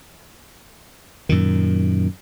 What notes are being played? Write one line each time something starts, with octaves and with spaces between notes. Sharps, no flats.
F#2 A#2 D#3